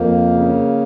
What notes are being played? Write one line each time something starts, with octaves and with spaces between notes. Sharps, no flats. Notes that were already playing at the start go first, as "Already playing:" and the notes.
Already playing: F2 A#3
C#3